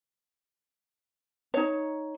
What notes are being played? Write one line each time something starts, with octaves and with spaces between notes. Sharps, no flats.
D#4 C#5